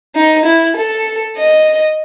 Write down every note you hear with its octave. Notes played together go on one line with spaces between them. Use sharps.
D#4
E4
A4
D#5